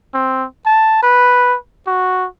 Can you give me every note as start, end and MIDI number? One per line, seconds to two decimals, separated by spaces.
0.14 0.45 60
0.66 1.00 81
1.02 1.56 71
1.87 2.27 66